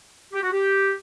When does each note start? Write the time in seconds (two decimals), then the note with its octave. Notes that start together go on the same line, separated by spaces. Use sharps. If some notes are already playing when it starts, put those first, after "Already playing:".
0.33 G4
0.42 F#4
0.53 G4